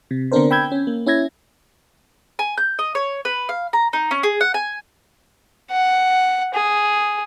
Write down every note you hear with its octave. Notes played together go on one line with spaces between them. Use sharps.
C3
D3 B3 C4 D4 A#4 C5
G5 B5 E6 G6 G#6
C#4
A#3
C#4 E4 E5 G#6 A#6
G#5
G6
D#5
C#5
B4
F5
A#5
D#4
C#4
G#4
F#5
G#5
F#5
G#4